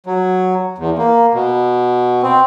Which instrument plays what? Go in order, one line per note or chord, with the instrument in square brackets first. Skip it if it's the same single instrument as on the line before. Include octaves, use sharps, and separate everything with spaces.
[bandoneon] F#3
E2
A#3
B2
C4